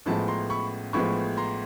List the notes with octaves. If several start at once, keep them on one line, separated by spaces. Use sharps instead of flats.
A1 A2 F3 G#3 B3 A5 B5
A#5 C6
B5 C#6
A1 A2 F3 G#3 B3 B5 C#6
A#5 C6